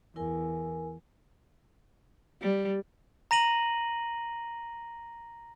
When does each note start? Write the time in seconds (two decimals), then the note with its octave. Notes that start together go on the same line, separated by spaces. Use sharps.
0.16 E2 E4 A#4 G#5
2.42 G3
3.31 A#5 A#6 D#7 F#7